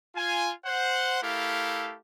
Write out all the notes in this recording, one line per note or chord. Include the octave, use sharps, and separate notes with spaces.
F4 G#5
C5 F#5
A3 E4 G4 A4 A#4 F5